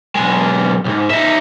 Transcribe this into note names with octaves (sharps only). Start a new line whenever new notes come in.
B1 G#3
B1 G#2
D#4 E5